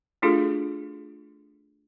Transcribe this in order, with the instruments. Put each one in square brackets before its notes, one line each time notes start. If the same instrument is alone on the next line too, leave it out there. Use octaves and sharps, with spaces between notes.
[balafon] A3 D4 F4 F#4 G#4 A4